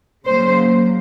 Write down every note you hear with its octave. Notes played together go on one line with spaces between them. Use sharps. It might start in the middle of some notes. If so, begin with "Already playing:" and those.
C#3 F#3 A#3 C5